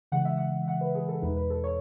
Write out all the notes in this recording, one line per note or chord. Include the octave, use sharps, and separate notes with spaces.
C#3 E3 G#3 F#5
E5
F#5
F#5
B4
G#4
A4
E2 B2 G#3 D#4 B4
B4
A4
C#5